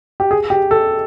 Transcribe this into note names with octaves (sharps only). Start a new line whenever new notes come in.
G4
G#4
G4
A4